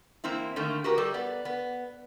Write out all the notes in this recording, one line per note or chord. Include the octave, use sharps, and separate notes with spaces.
E3 A#3 C4 E4
D3 D#3 A3 A#3
F#4 G4 A#4 B4
G3 A4
B3 D5
B3